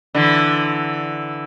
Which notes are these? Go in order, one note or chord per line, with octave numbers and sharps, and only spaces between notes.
D3 E3